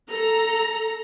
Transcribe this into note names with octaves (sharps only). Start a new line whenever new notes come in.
A4 A#5